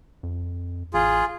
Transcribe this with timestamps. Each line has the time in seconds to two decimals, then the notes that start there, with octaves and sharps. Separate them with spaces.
0.23 F2
0.94 A1 F4 G#4